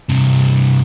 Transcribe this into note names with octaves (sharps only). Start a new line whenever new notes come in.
G2 C3